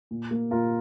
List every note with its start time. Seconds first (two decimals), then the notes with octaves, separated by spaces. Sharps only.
0.11 A#2
0.31 A#3
0.51 A#2 F4 A#4